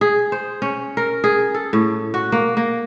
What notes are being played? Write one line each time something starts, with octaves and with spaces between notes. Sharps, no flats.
G#4
C5
C#4
A#4
G#4
A4
A2
F#4
A#3
A#3